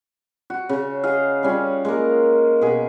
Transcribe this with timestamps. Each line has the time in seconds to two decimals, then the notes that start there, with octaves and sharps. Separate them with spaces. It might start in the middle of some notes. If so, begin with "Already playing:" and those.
0.50 F#4
0.69 C#3
1.03 G#4 D#5 F5
1.43 G3 C#4 F4
1.85 G#3 A#3 A#4
2.61 B2 G#4